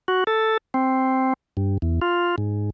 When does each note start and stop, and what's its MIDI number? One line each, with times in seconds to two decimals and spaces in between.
0.08 0.24 66
0.27 0.57 69
0.74 1.33 60
1.57 1.78 43
1.82 2.00 40
2.02 2.36 65
2.38 2.70 44